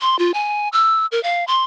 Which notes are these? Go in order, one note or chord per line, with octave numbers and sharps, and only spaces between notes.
C6
F4
G#5
E6
A#4
F5
C6